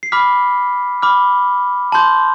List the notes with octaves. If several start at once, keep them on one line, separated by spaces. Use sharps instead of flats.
C7
B5 D6 F6 B6
B5 D6 F6
A5 C6 G6